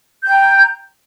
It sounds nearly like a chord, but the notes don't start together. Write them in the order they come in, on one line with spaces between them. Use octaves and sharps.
G6 G5 A#5